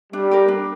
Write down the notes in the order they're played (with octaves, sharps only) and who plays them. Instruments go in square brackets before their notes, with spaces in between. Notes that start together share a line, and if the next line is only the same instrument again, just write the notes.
[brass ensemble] G3 [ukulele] D4
[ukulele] G4 A#4
D4